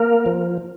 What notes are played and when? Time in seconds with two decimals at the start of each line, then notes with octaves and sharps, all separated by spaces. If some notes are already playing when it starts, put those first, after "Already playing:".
Already playing: A#3 A#4
0.26 F3